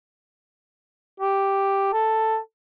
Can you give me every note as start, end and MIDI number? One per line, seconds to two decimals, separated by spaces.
1.20 1.89 67
1.93 2.37 69